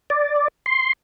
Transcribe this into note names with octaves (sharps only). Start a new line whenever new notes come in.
D5
C6